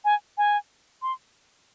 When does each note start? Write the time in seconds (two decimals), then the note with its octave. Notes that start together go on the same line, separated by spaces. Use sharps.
0.05 G#5
0.38 G#5
1.02 C6